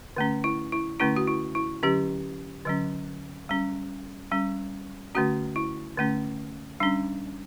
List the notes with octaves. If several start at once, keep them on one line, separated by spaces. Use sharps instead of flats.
D3 A3 C#4
E4
E4
D3 A3 C#4 E4
F#4
E4
E4
D3 F#3 C#4 G4
D3 F#3 C#4
G3 C#4
G3 C#4
D3 A3 C#4 F#4
E4
D3 A3 C#4
G3 C#4 D4